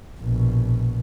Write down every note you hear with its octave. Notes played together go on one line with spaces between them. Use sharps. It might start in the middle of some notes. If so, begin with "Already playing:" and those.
A#1 B2